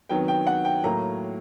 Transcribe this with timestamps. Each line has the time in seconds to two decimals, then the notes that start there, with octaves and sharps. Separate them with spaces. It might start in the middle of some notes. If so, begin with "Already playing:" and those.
0.09 C3 D#3 F#3 B3 G5
0.28 G5
0.47 F#5
0.65 G5
0.84 A2 F#3 A#3 A#5